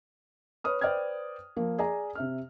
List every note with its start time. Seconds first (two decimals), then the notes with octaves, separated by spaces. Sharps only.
0.64 B4 C#5 D#6 F6
0.81 B4 C5 D5 G5 F6 G#6
1.56 F3 A#3 A#4
1.79 G#4 D5 G#5 A#5
2.15 C3 E5 F6